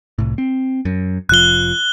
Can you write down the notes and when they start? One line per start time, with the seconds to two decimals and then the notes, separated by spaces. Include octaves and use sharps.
0.18 C2 A2
0.38 C4
0.85 F#2
1.29 F1 F3 F#6 G7